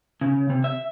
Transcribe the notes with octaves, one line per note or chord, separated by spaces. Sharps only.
C#3
C3
E5